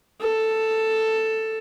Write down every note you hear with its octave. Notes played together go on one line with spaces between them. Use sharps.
A4